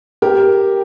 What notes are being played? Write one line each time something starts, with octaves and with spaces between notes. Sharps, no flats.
G4 A#4